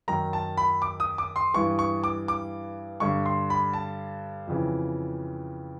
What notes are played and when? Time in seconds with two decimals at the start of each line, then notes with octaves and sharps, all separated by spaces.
0.08 F#2 D#3 A#5
0.33 A5
0.57 B5
0.82 D6
1.00 D#6
1.18 D6
1.36 C6
1.54 G2 E3 C#6
1.79 C#6
2.04 D6
2.28 D6
3.00 G2 D3 C#6
3.26 C6
3.50 B5
3.74 A5
4.47 F2 C#3 E3